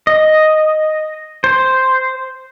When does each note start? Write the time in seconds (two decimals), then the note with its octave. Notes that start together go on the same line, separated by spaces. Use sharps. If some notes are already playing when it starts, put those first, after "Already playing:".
0.07 D#5
1.44 C5